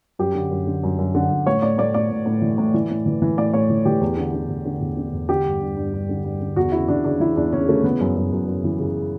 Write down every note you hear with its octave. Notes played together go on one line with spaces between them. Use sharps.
F#2 G4
D3
F#2
D3
F#2
F#2
D3
F#2
A2 C#5
A2 D5
A2 D5
A2 D5
A2
A2
E3
A2
E3
A2
E3
E3
A2 D5
A2 C#5
E3
E3 G4
E2
D3
D3
E2
D3
E2
D3
E2
D3 G4
G2
G2
G2
G2
D3
G2
D3
E2 F#4
C#3 E4
E2 D4
C#3 D4
E3 E4
E2 D4
C#3 C#4
C#3 A3
E3 B3
F#2
F#2
F#2
F#2
E3
C#3